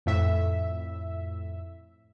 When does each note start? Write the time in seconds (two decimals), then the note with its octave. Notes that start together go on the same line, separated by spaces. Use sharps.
0.06 F2 A2 E5